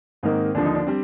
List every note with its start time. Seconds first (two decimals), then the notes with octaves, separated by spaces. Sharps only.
0.23 G#2 D#3 A#3 C4 D#4 A#4
0.55 D#2 D3 F3 D4
0.65 D#4
0.75 D4
0.87 G3 C4